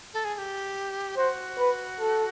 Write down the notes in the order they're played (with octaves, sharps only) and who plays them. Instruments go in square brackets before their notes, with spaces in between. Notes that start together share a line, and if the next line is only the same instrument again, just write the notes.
[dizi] A4
G#4
G#4
G4
[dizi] F#4 [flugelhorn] C5
[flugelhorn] B4
A4